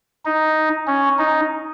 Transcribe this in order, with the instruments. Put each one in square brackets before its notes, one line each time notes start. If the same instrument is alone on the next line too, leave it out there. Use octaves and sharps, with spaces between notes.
[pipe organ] D#4
C#4
D#4